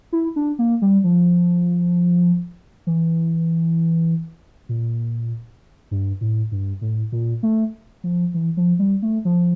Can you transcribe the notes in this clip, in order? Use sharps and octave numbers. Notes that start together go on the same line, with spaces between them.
E4
D4
A#3
G3
F3
E3
A#2
G2
A2
G2
A2
A#2
A3
F3
E3
F3
G3
A3
F3